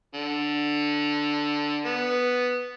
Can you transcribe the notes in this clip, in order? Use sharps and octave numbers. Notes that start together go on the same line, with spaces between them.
D3
B3